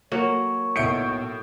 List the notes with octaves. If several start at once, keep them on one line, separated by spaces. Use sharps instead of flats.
F#3 A#3 C#5
B1 A2 E5 G6 C#7 D7